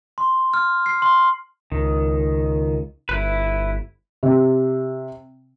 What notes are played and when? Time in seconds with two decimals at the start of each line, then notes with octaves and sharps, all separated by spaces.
0.18 C6
0.54 F6
0.86 C7
1.02 C6
1.72 C#2 D#3
3.09 G1 E4 B4
4.23 C3